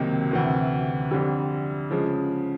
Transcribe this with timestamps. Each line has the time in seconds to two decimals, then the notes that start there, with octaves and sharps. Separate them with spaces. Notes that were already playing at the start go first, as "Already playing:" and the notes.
Already playing: C#2 C3 D#3 F#3 A#3
0.31 D2 C3 E3
1.11 F2 D3 G3
1.91 C#3 F3 G#3